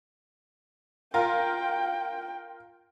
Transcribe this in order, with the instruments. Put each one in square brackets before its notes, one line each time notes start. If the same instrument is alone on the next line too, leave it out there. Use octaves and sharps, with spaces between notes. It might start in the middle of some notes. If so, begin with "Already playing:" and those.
[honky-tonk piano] F4 A#4 [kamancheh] G5